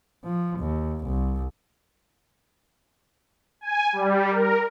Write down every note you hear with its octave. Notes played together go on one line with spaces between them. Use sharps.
F3
D#2
C2
G#5
G3
A#4